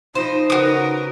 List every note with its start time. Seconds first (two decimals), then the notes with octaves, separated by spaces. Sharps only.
0.15 F3 D#4 C5 D#5
0.50 C#3 F#4 A#4 B4 D#6